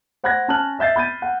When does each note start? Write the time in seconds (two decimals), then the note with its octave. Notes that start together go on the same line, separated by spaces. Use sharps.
0.23 C5 F#5 B5 F#6 G#6 A#6
0.48 C#4 A5 F6 F#6 F#7
0.79 D#5 E5 G6 A6 C7
0.96 B5 G6 A6 D#7
1.22 F#5